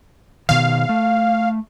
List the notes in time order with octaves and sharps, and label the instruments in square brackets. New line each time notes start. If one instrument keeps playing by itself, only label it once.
[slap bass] B2 D#3 [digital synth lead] F5
[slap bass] A3